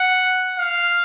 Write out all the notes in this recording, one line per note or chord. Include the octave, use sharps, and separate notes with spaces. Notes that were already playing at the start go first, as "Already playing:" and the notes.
Already playing: F#5
F5